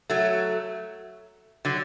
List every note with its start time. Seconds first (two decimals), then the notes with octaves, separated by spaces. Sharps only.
0.10 F#3 A3
1.65 D3 F#3